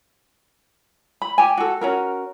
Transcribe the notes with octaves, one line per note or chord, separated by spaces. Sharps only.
B5
G4 G#5
F#4 A4
C#4 F#4 A#4